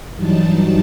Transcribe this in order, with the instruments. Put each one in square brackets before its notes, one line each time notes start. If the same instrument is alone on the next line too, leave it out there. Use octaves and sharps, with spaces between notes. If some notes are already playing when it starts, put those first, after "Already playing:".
[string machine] G2 E3 F#3 G3 D#4 A5